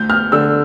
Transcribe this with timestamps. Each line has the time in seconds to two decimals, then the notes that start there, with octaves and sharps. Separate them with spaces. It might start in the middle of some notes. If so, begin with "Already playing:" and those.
Already playing: D2 G6
0.10 F6
0.32 D3 E6